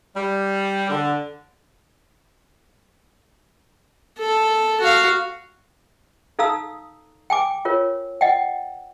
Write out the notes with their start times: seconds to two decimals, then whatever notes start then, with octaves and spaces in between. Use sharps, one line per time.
0.15 G3
0.89 D3
4.19 A4
4.81 F#4 F5
6.39 D#4 A4 F5 A#5 D#6 E6
7.30 G5 G#5 D6
7.65 F4 A#4 C#5
8.21 D#5 F#5 G5